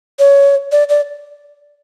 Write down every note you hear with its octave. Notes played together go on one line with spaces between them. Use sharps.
C#5
D5
D5